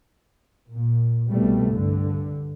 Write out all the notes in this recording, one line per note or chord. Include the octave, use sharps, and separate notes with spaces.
A#2
C2 B2 G3 A3
G2 D3